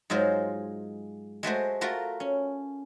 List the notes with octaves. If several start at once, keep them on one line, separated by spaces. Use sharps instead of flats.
G#2 F#3 G#3 F4 C5
G#3 A3 F#4 C5
A3 F4 F#4 A#4
C#4